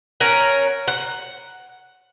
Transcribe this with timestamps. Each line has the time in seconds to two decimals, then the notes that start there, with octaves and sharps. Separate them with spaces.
0.20 C#4 A#4 F#5
0.88 F#5